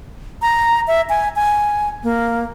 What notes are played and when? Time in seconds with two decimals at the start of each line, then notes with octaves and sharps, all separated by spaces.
0.42 A#5
0.87 E5
1.10 G#5
1.36 G#5
2.03 A#3